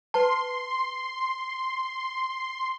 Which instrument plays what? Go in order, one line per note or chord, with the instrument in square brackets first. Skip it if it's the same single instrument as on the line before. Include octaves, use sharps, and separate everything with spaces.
[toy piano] B4 A5 [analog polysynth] C6